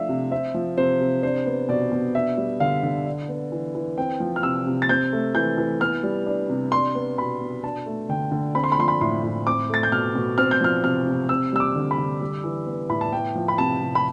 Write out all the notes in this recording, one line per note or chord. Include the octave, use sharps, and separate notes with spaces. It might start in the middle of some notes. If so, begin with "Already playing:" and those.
Already playing: F3 A3 D4 E5 F5
C3
C4 E5
F3
C3 C5
C3
D4 C5
B3
B2 D5
B2
D4 E5
G3
D3 F5
D3
D4
B3
E3
E3
C4 G5
F3
F6
C3 E6
C3
A6
C4 G6
A3
E3 G6
E3
B3 F6
G3
D4
C3
D4 C6
B3
B2 B5
B2
D4 A5
A3
D3 G5
D3
C4 B5
C6
B5
F3 C6
B5
A2 C6
A2
C4 D6
A3 A6
G6
B2 F6
B2
C4 F6
G6
F3 F6
C3 F6
C3
C4 E6
G3 E6
D6
D3
B5
D3
G3
E3
B3
A2 B5
A5
B3 G5
F3
B5
C3 A5
C3
B5